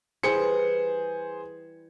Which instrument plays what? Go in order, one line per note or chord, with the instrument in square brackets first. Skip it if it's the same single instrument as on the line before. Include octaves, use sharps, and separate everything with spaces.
[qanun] E3 G3 [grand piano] G#4 C5 C#7